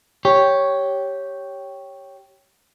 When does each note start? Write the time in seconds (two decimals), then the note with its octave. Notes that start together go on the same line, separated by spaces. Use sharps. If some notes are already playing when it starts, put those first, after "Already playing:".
0.25 G4 C#5